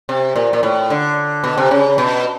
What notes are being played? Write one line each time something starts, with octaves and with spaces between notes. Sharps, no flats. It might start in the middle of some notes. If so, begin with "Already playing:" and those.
C3
A#2
A#2
A2
D3
B2
C3
C#3
B2